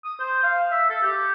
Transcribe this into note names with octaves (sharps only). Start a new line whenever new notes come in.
D#6
C5
F5
E5
A4
G4